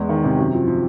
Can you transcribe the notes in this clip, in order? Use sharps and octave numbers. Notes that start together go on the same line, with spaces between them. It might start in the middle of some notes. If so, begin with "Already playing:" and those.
Already playing: E2 G#3
D#3
C3
F#2
F3
F3